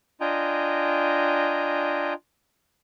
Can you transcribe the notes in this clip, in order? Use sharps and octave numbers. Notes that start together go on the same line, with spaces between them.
D4 F4 D#5 G5 G#5 A#5